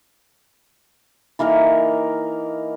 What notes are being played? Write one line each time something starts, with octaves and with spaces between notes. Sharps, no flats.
E3 A#3 D#4 A#4